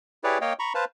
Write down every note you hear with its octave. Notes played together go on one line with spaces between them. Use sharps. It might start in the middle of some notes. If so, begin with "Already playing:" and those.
E4 G4 G#4 B4 C#5 D5
A#3 C#5 D#5 F5 G5
A#5 B5 C#6
B4 C5 F5 A5